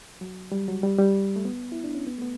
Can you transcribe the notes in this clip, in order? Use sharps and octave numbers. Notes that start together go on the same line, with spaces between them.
F#3
G3
F#3
G3
G3
A3
B3
E4
D4
C#4
B3
A3
B3